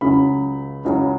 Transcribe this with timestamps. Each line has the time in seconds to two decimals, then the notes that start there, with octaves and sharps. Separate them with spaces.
0.01 C#2 C#3 F#3 B5
0.85 C#2 C#3 F#3